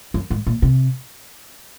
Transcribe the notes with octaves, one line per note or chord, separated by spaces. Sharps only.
F#2
G#2
A#2
C3